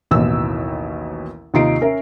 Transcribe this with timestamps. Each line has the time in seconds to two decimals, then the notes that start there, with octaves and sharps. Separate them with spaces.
0.11 A1 D#2 B2 E3 E6
1.54 D#2 C3 D#4 F4 C7 D7
1.81 C#4 A#4 E5